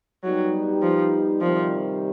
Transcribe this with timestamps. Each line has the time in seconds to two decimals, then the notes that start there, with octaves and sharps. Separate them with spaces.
0.24 F#3 G3 B3 D#4 G4
0.82 F3
1.41 C3 D#3 F3 G3